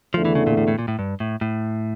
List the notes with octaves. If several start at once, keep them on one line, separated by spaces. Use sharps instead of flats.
E2 D3 F3 A3
E3
C#3
A#2
A2
A2
A#2
A2
G2
A2
A2